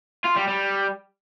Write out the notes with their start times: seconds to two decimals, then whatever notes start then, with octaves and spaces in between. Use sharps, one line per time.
0.24 F4
0.36 G3
0.48 G3